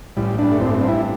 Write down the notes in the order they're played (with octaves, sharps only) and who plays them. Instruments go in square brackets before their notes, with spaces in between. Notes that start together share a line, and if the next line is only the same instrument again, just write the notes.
[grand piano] A1 [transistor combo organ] G3
[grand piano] G2 G3 [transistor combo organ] D4
[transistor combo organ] A3
[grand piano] A1 [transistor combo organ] C4
[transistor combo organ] A3
C4
[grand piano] G2 G3
[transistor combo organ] E4